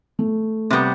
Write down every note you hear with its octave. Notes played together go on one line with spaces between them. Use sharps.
A3
C3 G3 B3 C4